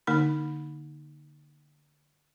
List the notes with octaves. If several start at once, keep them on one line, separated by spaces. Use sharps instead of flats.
D3 A#3 D#4 B5